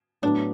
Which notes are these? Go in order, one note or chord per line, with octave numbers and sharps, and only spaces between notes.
A2 F#3 B3 D4